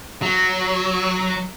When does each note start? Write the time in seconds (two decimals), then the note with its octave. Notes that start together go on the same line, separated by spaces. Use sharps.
0.22 F#3